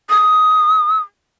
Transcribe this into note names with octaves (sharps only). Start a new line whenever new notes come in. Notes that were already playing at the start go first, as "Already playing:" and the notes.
D#6